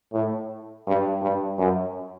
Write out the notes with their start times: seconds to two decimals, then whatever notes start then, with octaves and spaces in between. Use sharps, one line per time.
0.14 A2
0.87 G2
1.22 G2
1.59 F#2